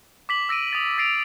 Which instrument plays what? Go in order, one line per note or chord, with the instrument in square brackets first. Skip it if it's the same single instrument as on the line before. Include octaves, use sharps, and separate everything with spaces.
[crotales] D6 B6 F#7
E6 A#6 D7 D#7
D#6 A6
D6 A6 A#6 C7 D7 F7